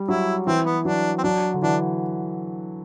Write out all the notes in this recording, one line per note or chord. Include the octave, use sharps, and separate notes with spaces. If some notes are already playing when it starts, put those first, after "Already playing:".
Already playing: G3
F#3 E4
E3 C4
B3
F#3 D4
C4
F#3 D4
D3
E3 D4